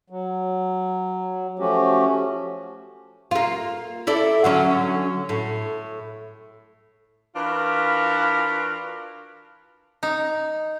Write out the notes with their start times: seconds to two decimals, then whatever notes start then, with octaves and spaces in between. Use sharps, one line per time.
0.10 F#3
1.59 F3 A3 C#4 F#4 G4
3.31 A#3 F4
4.07 E4 A4 D5
4.44 D3 F#3 C#4
5.29 A2
7.36 E3 D4 F4 F#4 A#4 B4
10.03 D#4